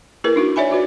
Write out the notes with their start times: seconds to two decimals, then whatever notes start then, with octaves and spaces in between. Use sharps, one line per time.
0.24 A#3 E4 G#4 A#4 B4
0.36 D4 D#4 F#4
0.56 C#5 D5 E5 G#5 B5
0.71 F4 F#4 B4 D5